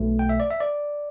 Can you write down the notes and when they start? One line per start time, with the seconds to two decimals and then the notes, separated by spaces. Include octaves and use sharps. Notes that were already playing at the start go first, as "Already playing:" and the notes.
Already playing: B1 B2 A3
0.19 G5
0.29 E5
0.40 D5
0.50 E5
0.60 D5